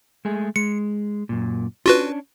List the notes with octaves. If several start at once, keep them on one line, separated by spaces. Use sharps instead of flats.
G#3 A3 G#4
G#3 C#7
F#2 A#2
C#4 D4 F4 F#4 B4